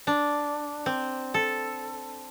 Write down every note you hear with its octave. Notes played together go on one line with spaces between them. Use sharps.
D4
C4
A4